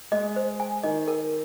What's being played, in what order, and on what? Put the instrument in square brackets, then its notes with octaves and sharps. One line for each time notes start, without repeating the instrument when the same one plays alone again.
[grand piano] G#3 [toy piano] D#5
[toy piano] C5
G#5
[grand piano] D#3 [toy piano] D#5
[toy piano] A#4